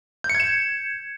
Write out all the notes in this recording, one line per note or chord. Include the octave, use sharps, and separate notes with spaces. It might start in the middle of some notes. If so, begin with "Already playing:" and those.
G6
C#7
G#6
E7